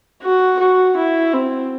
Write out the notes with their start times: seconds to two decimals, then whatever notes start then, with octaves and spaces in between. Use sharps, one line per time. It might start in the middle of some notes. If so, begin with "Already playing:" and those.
0.22 F#4
0.60 F#4
0.97 E4
1.34 C4